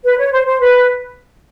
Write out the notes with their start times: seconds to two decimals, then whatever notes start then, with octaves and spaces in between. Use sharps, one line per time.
0.03 B4
0.18 C#5
0.32 C5
0.46 C5
0.60 B4